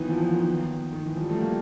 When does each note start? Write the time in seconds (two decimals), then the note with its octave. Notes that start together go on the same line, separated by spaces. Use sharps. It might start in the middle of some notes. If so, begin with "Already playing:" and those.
Already playing: A#2 D#3 E3 F#3 B3
0.10 F3
0.22 F3
0.34 D#3
0.93 D#3
1.06 E3
1.17 F#2 D3 F3 G3
1.30 A3
1.41 A#3